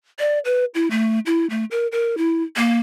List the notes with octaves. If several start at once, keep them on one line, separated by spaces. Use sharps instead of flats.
D5
B4
E4
A3
E4
A3
A#4
A#4
E4
A#3